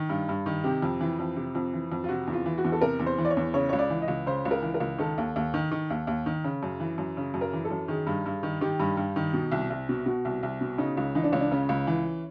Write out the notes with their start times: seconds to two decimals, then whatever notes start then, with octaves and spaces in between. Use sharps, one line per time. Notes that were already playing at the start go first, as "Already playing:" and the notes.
Already playing: D#3
0.09 G2
0.29 G2
0.46 D#3
0.64 C3 G4
0.82 F2
1.01 E3
1.19 F2
1.36 C3
1.55 F2
1.73 E3
1.92 F2
2.04 F4
2.09 C3 F#4
2.27 E2
2.33 F4
2.46 E3
2.58 F#4
2.64 E2
2.72 A4
2.81 C3 A#4
2.99 E2
3.06 C5
3.18 E3
3.25 D5
3.30 C#5
3.37 E2
3.54 C#3 C#5
3.69 C#2 C#5
3.79 D5
3.90 E3
4.02 D#5
4.08 C#2
4.26 C#3 C5
4.45 C#2
4.51 A#4
4.62 E3
4.74 A#4
4.80 C#2
4.98 D#3 A4
5.18 D#2
5.36 D#2
5.54 D#3
5.71 D#3
5.90 D#2
6.07 D#2
6.26 D#3
6.44 C#3
6.63 F#2
6.80 E3
6.98 F#2
7.17 C#3
7.34 F#2
7.41 A#4
7.53 E3
7.65 A4
7.71 F#2
7.88 D#3 G#4
8.07 G2
8.26 G2
8.43 D#3
8.61 D#3 G4
8.80 G2
8.97 G2
9.16 D#3
9.33 B2
9.51 C2
9.70 C2
9.89 B2
10.06 B2 F#4
10.25 C2
10.43 C2
10.61 B2
10.78 C#3 D#4
10.97 C#2
11.15 E3 D#4
11.24 D4
11.32 C#2 C#4
11.40 D4
11.51 C#3 C#4
11.69 C#2
11.87 E3